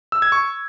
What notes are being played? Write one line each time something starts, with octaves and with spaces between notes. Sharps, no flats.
E6
G#6
C#6